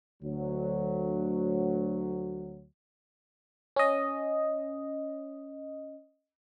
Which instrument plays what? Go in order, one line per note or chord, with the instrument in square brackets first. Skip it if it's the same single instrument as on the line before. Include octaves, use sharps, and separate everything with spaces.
[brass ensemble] D2 F#3
[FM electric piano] C#4 D#5